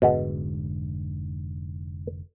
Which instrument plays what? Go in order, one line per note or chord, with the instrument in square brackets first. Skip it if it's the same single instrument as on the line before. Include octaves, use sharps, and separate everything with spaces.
[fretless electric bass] F1 G#2 D3 [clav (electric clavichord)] B2 G#3 B3